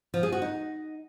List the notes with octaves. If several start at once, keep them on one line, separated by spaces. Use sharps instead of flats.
F3
G#4
F#4
D#4